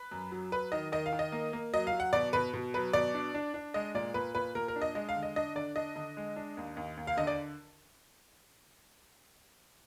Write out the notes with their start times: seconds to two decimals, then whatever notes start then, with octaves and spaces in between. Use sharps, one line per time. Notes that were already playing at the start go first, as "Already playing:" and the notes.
Already playing: B4
0.11 F#2
0.32 F#3
0.52 F#3 B4
0.72 D#3 D#5
0.92 D#3 D#5
1.06 F5
1.13 D#3
1.19 D#5
1.32 A#3
1.53 A#3
1.74 F#3 D#5
1.87 F5
1.93 F#3
2.00 F#5
2.13 B2 D5
2.33 B2 B4
2.53 B2
2.74 F#3 B4
2.93 B2 D5
3.14 D4
3.34 D4
3.54 D4
3.74 G#3 D#5
3.94 A#2 D5
4.14 A#2 B4
4.35 A#2 B4
4.55 A#2 A#4
4.68 A#4
4.76 D4
4.82 D#5
4.95 G#3 D#5
5.09 F5
5.16 D3
5.23 D#5
5.36 D4 D#5
5.55 D3 D5
5.76 D4 D#5
5.96 D3
6.17 G#3
6.36 D4
6.57 D#2
6.77 D#2
6.97 D#2
7.07 F5
7.17 D3 D#5
7.27 D5